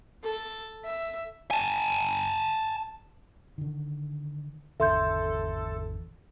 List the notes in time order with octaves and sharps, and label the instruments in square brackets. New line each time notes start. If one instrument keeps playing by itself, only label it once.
[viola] A4
E5
[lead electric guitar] G#5 A5
[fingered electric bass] D3 D#3
[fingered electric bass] G#1 E2 D3 [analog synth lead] A4 [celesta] E5 C6 G6